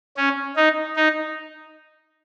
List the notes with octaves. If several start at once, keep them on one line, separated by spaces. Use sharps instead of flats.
C#4
D#4
D#4